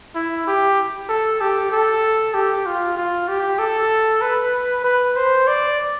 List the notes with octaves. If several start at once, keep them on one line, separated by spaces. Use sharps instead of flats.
E4
G4
A4
G4
A4
G4
F4
F4
G4
A4
B4
B4
C5
D5